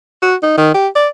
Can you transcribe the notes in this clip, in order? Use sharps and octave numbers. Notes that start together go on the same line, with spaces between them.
F#4
D#4
D#3
G4
D5